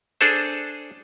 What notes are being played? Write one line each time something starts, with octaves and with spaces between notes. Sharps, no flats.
D4 G#4 A4 C5